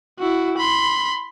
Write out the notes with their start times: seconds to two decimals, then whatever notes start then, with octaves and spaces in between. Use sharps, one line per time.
0.19 E4 F#4
0.58 B5 C6